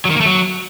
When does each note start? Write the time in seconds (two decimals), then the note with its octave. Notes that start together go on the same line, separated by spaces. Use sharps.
0.05 F#3
0.10 D#3
0.15 A#3
0.21 A3
0.26 F#3